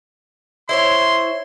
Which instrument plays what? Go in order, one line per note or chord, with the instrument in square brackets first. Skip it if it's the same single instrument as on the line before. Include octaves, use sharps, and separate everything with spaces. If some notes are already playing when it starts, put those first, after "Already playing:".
[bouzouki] E4 C5 C#5 [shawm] C6